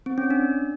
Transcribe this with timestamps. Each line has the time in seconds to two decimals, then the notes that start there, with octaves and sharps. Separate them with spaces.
0.06 C4
0.18 C#4
0.30 D4